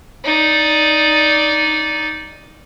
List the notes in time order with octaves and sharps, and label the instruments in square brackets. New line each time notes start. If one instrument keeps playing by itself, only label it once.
[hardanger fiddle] D#4 D5